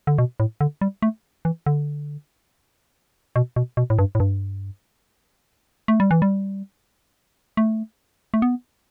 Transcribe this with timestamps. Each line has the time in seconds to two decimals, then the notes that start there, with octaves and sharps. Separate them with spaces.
0.07 D3
0.18 B2
0.40 A2
0.61 D3
0.81 G3
1.02 A3
1.45 E3
1.66 D3
3.36 B2
3.56 B2
3.77 B2
3.90 A2
3.99 G2
4.15 A2
4.20 G2
5.88 A3
6.00 G3
6.11 E3
6.22 G3
7.57 A3
8.34 A3
8.42 B3